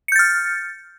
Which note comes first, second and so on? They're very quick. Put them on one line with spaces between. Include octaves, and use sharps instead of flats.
C#7 G6 A6 F6